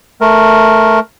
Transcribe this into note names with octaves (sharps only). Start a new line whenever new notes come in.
A3 A#4